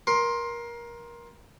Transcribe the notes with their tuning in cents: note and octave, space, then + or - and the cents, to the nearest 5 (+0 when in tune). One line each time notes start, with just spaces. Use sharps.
A#4 +20 C6 +15